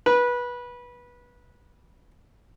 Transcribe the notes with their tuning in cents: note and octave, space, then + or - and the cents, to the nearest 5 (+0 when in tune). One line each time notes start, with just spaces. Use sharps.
B4 -20